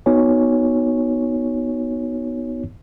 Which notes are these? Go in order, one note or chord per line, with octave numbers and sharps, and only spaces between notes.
B3 D#4 F#4 C#5 G#5